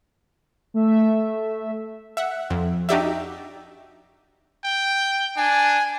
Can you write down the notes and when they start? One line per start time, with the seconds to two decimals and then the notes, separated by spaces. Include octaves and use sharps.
0.74 A3 E5
2.17 E5 F#5
2.50 F2
2.89 D4 D#4 F#4 G4 D5 E5
4.64 G5
5.37 D4 G#5